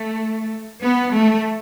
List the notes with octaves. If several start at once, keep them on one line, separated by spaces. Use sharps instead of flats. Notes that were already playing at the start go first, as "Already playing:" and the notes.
Already playing: A3
B3
A3